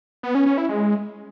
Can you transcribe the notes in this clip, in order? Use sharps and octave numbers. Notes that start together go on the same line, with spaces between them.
B3
C#4
C#4
E4
G#3